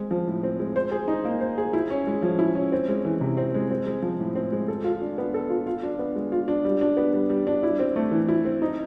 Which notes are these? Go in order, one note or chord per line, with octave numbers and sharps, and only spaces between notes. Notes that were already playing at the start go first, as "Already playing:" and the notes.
Already playing: G#3 C4
F3
A2
C4
G#3
C5
G#4
D#4
A#3
C5
G#4
E4
C#4
G#3
F3
E4
C#4
C4
G#3
E3
C3
C4
G#3
C4
G#3
F3
A2
C4
G#3
A4
F4
D4
B3
A4
F4
F4
D4
B3
G#3
F4
D4
G3
D4
B3
G3
G3
D4
E4
C4
A3
E3
E4
C4
D#4